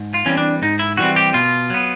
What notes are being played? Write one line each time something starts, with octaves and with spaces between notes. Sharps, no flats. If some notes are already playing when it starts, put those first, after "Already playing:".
Already playing: G#2
F4
E3 G3 C4 C#4
D4
G#2 D#4
E4
E3 G3 C4 F#4
G4
B2 F4
F#3 B3